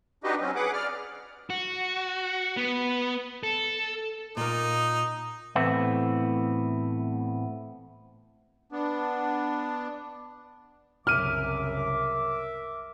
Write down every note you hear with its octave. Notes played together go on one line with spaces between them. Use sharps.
D4 D#4 F#4 G4 B4 D#5
F#3 C4 C#4
G#4 B4 F#5 D6
D5 F6
F#4
B3
A4
A#2 A#3 D#4
A2 E3 A3 B3 C4 E4
B3 D4
C2 F#2 C#3 A#4 E5 D6 F6 D#7